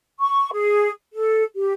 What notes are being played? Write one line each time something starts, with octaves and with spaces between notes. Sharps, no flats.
C#6
G#4
A4
G4